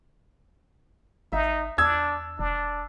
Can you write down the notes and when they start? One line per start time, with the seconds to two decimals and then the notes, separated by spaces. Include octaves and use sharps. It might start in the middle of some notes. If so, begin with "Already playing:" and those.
1.32 G#1 D#4 E5
1.78 E2 D4 E6 G#6
2.39 E1 D4